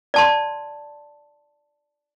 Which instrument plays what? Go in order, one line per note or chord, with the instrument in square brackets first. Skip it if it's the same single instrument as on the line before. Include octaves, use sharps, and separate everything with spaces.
[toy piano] D5 A5 C6